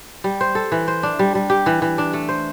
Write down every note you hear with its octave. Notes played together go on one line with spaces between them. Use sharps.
G3
C5
A4
E3
C5
D4
G3
G3
G4
E3
E3
D4
A3
C5